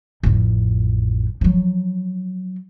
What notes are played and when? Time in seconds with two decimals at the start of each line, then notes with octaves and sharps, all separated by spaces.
0.23 A1 F2
1.41 F3 F#3